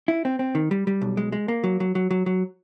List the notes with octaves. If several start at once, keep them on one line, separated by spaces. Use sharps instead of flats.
E4
C4
C4
D#3
G3
G3
B1
G#3
G#3
A#3
F#3
F#3
F#3
F#3
F#3